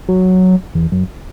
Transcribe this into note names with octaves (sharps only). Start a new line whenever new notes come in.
F#3
E2
F#2